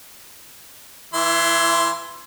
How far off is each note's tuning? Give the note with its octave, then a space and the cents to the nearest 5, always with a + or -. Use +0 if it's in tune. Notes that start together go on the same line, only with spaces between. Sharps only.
E3 +0 E4 +30 C6 +0